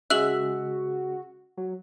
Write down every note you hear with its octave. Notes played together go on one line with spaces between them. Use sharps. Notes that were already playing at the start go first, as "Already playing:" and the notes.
C#3 G#3 F#4 E5 F#6 F#7
F#3